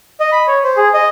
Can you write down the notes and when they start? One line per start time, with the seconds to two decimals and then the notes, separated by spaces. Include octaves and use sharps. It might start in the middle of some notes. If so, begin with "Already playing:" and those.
0.20 D#5
0.32 B5
0.47 C#5
0.64 C5
0.77 G#4
0.94 D#5